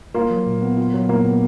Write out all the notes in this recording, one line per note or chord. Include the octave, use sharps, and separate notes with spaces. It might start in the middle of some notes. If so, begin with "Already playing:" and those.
A#3 F4
F#3
A#2
B3
F4
F#3
A#2 A#3
B3